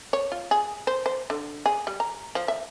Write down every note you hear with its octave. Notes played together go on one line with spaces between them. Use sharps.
C#5
F4
G#4
C5
C5
D3
G#4
G3
A#5
F3
E5